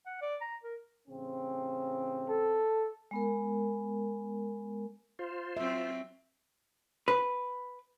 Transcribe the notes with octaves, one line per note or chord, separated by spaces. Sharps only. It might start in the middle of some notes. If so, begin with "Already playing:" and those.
F#5
D5
A#5
A#4
A1 C#3 C4
A4
G#3 B3 A#4
F4 C5
F#3 C4 E5
B4